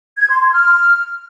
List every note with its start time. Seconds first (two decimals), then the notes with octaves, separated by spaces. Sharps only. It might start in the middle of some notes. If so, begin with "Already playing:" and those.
0.17 G#6
0.29 C6
0.40 C6
0.51 F6